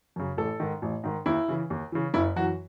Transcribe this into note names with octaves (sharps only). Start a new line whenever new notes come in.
F#2 C#3
A1 A4
G#2 D#3
A1
G#2 D#3
D#2 E4
C#3 E3
D#2
C#3 E3
F#1 E4
F#2 E3 F#4